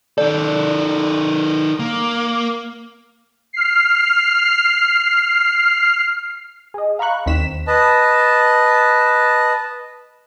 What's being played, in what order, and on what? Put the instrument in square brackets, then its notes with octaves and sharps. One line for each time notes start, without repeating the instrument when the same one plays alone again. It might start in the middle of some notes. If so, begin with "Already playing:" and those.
[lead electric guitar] D#3 A4 [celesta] D5
[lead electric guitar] A#3
[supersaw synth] F6 C7
[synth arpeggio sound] G#4 D#5
F5 A#5 B5 C#6 F#6
D#2 C4 D#4 B6 E7
[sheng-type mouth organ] B4 D#5 A5